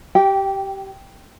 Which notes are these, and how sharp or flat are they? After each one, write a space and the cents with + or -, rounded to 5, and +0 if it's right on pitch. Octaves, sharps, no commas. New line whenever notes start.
G4 -20 G5 +0